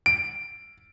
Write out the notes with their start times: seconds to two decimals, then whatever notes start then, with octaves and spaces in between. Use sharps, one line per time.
0.06 D7